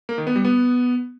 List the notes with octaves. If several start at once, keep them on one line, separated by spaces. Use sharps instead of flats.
A#3
D#3
B3
G3
B3